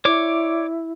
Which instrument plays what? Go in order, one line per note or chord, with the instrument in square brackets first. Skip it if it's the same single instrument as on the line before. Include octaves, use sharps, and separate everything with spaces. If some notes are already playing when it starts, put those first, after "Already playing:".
[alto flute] E4 [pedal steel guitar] C#5 D5 D6